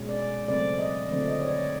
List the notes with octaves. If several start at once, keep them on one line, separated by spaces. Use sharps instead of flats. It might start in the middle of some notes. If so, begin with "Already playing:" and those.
Already playing: B2 G#3 C#4
D5
C#3 F#3 A3 C4 D5
D#5
D3 F3 A3 C4 D5
D#5
C#5
D5